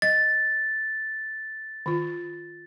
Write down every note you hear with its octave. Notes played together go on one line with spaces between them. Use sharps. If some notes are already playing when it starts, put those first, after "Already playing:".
D#5 A6
D#3 F4